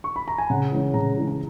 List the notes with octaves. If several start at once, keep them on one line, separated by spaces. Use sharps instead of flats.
C#6
B5
A#5
G#5
C#3 F#5
E3 G#3 C#4
C#3 A#5
E3 G#3 C#4
A#5